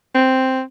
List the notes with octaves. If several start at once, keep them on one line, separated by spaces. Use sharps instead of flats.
C4